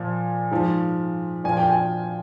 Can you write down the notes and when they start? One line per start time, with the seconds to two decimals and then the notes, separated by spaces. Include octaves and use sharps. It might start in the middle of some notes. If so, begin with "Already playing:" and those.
Already playing: A#2 F3
0.51 G#2 F3
1.44 A#2 F3 G#5
1.57 G5
1.70 G#5